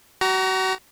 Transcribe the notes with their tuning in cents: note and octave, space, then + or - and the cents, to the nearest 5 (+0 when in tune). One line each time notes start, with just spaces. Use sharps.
F#4 +35 A#5 +0